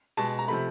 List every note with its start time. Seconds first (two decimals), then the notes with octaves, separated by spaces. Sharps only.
0.17 B2 G#3 A5
0.38 A#5
0.48 C3 F3 A3 B5